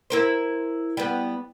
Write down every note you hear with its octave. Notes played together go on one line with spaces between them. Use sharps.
E4 A#4 C5
G3 B3